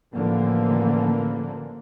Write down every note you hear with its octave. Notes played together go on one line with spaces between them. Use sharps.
A1 D3 E3 F3 A#3